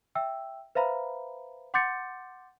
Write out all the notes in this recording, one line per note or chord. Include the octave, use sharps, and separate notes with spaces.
E5 G5 E6
B4 C5 E5 F5 A#5 B5
F#5 C6 D6 G6 A6 C#7